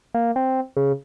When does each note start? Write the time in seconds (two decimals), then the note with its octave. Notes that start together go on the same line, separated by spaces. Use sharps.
0.14 A#3
0.36 C4
0.77 C#3